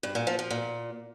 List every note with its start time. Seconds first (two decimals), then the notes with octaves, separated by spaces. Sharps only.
0.03 G2
0.15 A#2
0.27 F3
0.39 F3
0.51 A#2